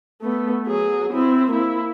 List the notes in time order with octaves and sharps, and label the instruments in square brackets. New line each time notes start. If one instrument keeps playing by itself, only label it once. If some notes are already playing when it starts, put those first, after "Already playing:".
[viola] A3 B3
F#3 G#4
C4 E4
A#3 E4